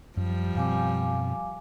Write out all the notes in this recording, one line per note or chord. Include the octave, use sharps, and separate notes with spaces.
F#2 F3 G3
F#2 B2 C4 F5 G#5 D6